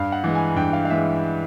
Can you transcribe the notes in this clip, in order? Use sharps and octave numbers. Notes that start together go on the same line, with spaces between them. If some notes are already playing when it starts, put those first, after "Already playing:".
Already playing: G2 F5
F#5
E3 G#3
G#5
G2 G5
F5
F5
E3 G#3 E5